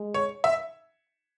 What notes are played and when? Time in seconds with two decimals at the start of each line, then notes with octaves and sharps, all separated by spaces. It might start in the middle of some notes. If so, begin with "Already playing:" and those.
Already playing: G#3
0.14 C#5
0.44 E5